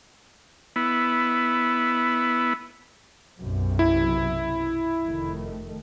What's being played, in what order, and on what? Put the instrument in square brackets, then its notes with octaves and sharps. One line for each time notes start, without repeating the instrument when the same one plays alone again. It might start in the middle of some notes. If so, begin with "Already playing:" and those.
[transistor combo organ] B3 E4
[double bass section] B1 F#2 C3
[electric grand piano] E4
[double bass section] F1 D#3 A3